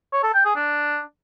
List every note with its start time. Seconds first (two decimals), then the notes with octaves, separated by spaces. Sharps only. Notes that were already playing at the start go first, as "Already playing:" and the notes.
0.12 C#5
0.23 A4
0.34 G5
0.45 G#4
0.56 D4